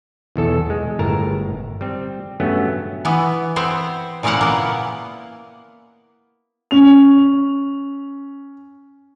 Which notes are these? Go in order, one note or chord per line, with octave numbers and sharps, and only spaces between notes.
B1 E2 A4 A5
G#3
G1 A2 A#4 A5 A#5
G3 C4
G2 F#3 A3 B3 C#4
E3 B3
B3 C4 C5 C#5
A#2 C#3 C4 E4 F5 F#5
A#3 B3
C#4 F7